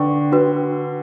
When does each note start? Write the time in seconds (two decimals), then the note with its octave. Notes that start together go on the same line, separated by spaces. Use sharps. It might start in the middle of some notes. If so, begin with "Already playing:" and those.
Already playing: D3 B4 D5 G5 C#6
0.32 D4 F#4 B4